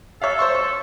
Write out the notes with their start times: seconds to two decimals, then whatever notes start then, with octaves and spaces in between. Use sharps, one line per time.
0.22 A4 C#5 E5 F5
0.39 C5 C6 C#6
0.55 C#6